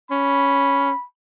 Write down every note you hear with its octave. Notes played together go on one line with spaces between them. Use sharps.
C#4 B5